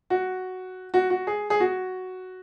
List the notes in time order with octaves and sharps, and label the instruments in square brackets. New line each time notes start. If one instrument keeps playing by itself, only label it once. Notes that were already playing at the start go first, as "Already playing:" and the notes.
[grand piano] F#4
F#4
F#4
G#4
G#4
F#4